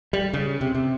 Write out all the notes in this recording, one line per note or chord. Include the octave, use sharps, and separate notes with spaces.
G3
C#3
C3
C3